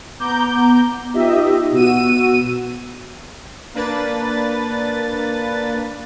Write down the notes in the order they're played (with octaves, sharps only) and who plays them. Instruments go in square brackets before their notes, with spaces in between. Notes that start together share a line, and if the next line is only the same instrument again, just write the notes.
[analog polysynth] B3 A#5 D6 G6
B3 D#4 F4 G4 D#5 E5
B2 B3 F#4 E6 D#7
A#3 D4 B4 A6